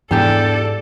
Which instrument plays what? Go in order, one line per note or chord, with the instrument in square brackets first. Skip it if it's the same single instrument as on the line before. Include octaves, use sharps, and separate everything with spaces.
[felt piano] E2 [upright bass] G#2 G#3 [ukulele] D4 G4 A5 [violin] A4 D5